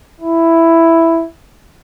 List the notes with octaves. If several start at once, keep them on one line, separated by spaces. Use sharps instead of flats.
E4